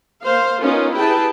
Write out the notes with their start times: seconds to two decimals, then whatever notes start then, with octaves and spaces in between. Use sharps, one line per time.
0.23 A#3 C5 F5
0.63 B3 C#4 D#4 F4 A#4
0.96 E4 G4 G#4 B4 G5 A5